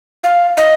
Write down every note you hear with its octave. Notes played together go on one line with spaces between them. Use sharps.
F5
D#5